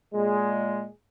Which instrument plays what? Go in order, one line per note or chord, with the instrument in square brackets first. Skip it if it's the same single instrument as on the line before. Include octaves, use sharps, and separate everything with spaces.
[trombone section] A#2 G#3